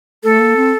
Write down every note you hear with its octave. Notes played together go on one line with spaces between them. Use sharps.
A3 A4
A#3
C4